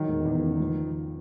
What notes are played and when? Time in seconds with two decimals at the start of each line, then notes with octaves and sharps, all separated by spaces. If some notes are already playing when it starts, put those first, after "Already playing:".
Already playing: D#3 F#3
0.08 E1
0.25 E2
0.43 C#3
0.60 F3